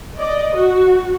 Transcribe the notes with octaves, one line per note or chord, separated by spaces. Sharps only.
D5 D#5
F#4